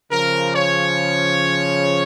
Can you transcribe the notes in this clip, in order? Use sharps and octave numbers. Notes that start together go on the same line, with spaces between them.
C#3 F3 A#4
C#5